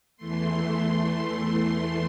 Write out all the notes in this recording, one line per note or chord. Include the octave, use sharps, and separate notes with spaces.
E2 E3 A3 C6